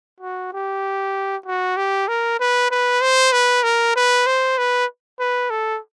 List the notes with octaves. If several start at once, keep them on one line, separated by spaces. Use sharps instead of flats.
F#4
G4
F#4
G4
A#4
B4
B4
C5
B4
A#4
B4
C5
B4
B4
A4